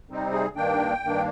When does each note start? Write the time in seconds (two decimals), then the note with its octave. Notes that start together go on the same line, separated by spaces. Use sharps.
0.09 C3 G3 C4 D#4
0.32 G#4
0.56 G2 D#3 A#3 D4 G5
1.03 G2 D#3 A#3 D4